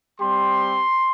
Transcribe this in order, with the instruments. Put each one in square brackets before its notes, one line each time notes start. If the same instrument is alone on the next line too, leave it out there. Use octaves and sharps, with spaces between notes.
[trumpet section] G3 C4 G4 C6